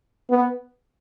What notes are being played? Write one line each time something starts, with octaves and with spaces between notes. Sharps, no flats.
B3